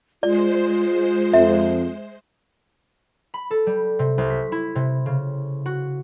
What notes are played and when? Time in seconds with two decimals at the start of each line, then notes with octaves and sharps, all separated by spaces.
0.23 G#3 F4 C5 D5
1.34 F2 E5
3.34 B5
3.51 A4
3.67 G3
3.99 C3
4.18 C2
4.30 B6
4.52 E4
4.75 C3
5.06 C#3
5.66 F#4